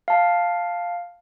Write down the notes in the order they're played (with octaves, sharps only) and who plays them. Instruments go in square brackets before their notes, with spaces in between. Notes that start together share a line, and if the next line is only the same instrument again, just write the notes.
[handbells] F5 A5